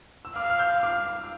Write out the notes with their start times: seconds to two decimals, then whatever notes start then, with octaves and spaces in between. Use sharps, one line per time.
0.25 E6
0.36 F5 D6 F6
0.50 F6
0.59 E6 G6
0.83 D6 F6